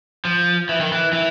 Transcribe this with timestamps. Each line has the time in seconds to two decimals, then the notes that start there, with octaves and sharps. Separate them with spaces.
0.25 F3
0.69 E3
0.80 D#3
0.92 E3
1.13 E3